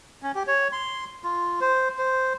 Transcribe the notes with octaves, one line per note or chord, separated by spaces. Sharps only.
C#4
G4
C#5
C6
F4
C5
C5